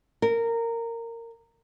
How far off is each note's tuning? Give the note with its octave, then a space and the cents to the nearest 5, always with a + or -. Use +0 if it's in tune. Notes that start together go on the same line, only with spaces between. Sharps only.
A#4 -15